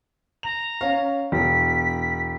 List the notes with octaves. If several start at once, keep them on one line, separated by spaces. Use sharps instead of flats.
A#5 F7
C#4 F5
E1 B6